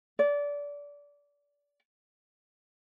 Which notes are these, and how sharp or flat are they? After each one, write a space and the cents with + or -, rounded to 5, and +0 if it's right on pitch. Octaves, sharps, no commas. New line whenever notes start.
D5 -25